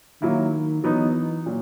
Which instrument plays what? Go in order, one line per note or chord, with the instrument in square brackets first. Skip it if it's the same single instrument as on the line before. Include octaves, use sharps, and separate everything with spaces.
[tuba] D#3 [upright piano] F#3 A#3 E4
[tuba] E3 [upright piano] F#3 B3 D#4
[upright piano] A#2 F#3